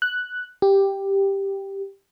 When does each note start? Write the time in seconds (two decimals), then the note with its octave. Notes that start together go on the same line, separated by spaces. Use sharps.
0.02 F#6
0.62 G4